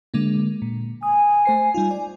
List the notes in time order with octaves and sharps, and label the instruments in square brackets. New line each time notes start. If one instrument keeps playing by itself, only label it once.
[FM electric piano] D3 G#3 A#3
A#2
[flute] G#5 [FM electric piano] D#6
[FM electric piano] A3 C5 C7
G3 D#4 F4
D5